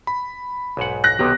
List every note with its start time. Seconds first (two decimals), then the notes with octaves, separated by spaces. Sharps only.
0.07 B5
0.77 B1 G#2 F#5
1.04 F#6 A#6
1.19 B1 C3 D#3 B3 G4